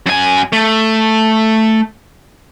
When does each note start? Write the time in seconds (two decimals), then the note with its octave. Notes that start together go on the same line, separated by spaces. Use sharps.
0.07 F#2 G#5
0.52 A3